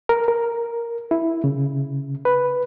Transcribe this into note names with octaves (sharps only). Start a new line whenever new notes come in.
A#4
A#4
E4
C#3
B4